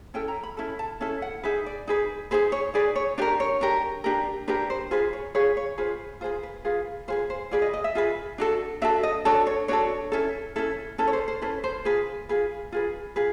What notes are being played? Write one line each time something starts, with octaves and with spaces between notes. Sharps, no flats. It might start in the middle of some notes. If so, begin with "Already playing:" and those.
C#4 E4 A4 G5
A#5
B5
C#4 E4 A4
A5
C#4 E4 A4
F#5
D#4 G#4 B4 E5
D5
D#4 G#4 B4
D#4 G#4 B4 C5
C#5
D#4 G#4 B4 D5
C#5
D4 G4 A#4 D5
C#5
D4 G4 A#4
D4 G4 A#4
D4 G4 A#4 B4
C5
F4 G#4 B4 C5
C#5
F4 G#4 B4 C#5
C#5
F4 G#4 B4 C5
F4 G#4 B4 C5
B4
F4 G#4 B4
F4 G#4 B4 C5
C5
F4 G#4 B4 D5
D#5
D#5
E5
F4 G#4 B4
D4 F#4 A4
D4 F#4 A4 E5
D#5
D4 F#4 A4 C#5
C#5
D4 F#4 A4 C#5
C#4 E4 A4
C#4 E4 A4
C#4 E4 A4 B4
C#5
C5
C5
C#4 E4 A4 B4
C5
F4 G#4 B4
F4 G#4 B4
F4 G#4 B4
F4 G#4 B4